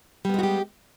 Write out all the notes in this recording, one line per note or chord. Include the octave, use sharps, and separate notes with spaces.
G3 G#3 B3 F#4 G4